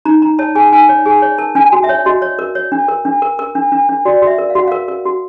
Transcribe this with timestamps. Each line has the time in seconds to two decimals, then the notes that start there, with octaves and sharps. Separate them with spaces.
0.05 D#4 A#5
0.22 D#4 A#5
0.39 C#5 A5
0.55 G#4 G#5
0.72 D#4 G#5
0.89 C#5
1.06 G#4 G#5
1.22 C#5
1.38 A#4 A5
1.55 D4 G#5
1.61 A5
1.72 F#4
1.84 E5
1.89 C#5
2.06 F#4 D#5
2.22 C#5
2.39 A#4
2.55 C#5
2.72 D4
2.89 A#4
3.05 D4
3.22 A#4
3.39 A#4
3.55 D4
3.72 D4
3.89 D4
4.05 F#4 D5
4.22 F#4
4.27 E5
4.38 A#4
4.50 F5
4.55 F#4 F#5
4.68 A#4 F5
4.88 A#4
5.05 F#4